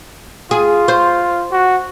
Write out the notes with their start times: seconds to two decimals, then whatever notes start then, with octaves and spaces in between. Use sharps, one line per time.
0.51 F4 G#4
0.88 C5
1.52 F#4